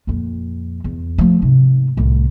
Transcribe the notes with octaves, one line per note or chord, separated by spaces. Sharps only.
F2 A#2
E2
F3 A3
G#2 C3
C2 A2